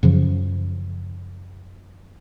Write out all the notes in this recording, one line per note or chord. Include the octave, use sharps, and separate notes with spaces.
F#2 C#3 F3